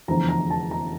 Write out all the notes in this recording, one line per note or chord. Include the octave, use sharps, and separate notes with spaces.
F1 E2 D3 F3 A#5
A#5
A5
A#5